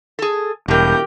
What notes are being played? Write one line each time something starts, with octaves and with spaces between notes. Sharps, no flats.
G#4 A4
E1 A2 G3 G4 A#4 G6